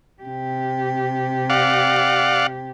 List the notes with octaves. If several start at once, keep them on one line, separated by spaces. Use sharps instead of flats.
C3 G4
D5 F5 F#5